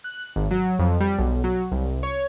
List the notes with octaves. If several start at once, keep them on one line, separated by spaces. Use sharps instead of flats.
F#6
G#1
F#3
F2
G3
B1
F#3
C2
C#5